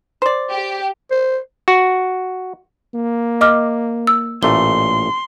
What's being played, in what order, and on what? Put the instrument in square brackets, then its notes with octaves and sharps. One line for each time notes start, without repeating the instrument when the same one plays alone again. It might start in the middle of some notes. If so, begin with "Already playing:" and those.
[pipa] C5 D5
[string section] G4
[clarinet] C5
[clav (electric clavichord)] F#4
[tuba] A#3
[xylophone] D#5 D6 F6
E6
[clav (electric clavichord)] A1 A#2 A3 [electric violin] C6 [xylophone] G7